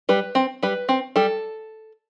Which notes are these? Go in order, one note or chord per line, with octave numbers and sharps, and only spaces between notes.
G3 B4
C4
G3 B4
C4
G3 A4